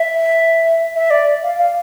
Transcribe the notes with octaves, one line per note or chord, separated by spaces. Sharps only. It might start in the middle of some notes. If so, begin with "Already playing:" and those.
Already playing: E5
E5
D5
F5
F5